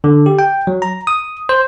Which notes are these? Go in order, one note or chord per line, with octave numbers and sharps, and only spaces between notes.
D3
G4
G5
F#3
A#5
D#6
C5